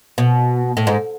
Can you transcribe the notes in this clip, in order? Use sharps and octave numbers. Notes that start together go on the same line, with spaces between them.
B2
A2
G#2